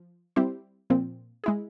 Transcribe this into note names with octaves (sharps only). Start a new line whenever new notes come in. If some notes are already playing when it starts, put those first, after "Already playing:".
Already playing: F3
G3 C4 E4 G4 C5
A#2 F3 C4
G#3 E4 G#4